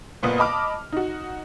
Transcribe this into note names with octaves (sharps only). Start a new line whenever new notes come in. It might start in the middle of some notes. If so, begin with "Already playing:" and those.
F#1 A#2 B3 D#6
D#5 A5 B5 D6 F6
D#4 F#4